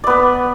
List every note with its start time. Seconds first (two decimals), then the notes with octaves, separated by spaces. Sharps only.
0.04 D5
0.07 B3
0.10 B4